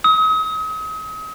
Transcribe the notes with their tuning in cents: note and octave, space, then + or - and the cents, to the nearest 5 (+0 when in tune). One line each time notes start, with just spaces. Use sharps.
D#6 +40